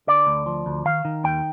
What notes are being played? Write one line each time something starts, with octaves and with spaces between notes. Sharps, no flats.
D3 D5
D2
F3
D2
D#3 F5
D#3
D#2 G5